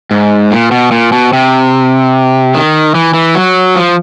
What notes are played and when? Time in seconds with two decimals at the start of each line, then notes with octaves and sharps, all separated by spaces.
0.11 G#2
0.51 A#2
0.71 B2
0.91 A#2
1.12 B2
1.33 C3
2.54 D#3
2.95 E3
3.14 E3
3.35 F#3
3.76 F3